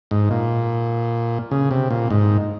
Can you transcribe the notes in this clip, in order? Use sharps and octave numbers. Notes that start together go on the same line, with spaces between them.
G#2
A#2
C#3
C3
A#2
G#2